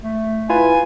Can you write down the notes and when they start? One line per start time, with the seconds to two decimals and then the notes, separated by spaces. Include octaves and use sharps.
0.02 A3
0.50 E4 F4 B4 G#5